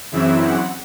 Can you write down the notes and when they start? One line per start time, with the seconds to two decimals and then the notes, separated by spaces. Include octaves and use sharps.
0.11 F#2 C#3 E3 C4 E4 E5
0.40 F#5